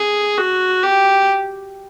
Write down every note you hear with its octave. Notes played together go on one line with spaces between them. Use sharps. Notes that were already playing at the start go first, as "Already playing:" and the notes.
Already playing: G#4
F#4
G4